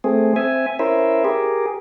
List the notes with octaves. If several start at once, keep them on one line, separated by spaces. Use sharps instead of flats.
A3 C4 G#4
C4 E5 G#5
C#4 E4 A#4 C5 E5
G4 G#4 A#4